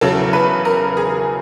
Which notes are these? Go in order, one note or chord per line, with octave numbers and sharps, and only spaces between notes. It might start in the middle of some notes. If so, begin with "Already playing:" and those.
E2 C#3 F#3 A4
B4
A#4
G#4